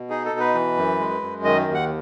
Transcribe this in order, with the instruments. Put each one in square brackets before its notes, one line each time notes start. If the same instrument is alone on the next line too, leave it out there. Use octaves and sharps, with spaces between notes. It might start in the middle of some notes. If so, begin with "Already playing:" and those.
Already playing: [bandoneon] B2
D#4 G#4
A4
B2
B4
E3
F#2
G#3
F#2
D#3 D#5
D#2
F#5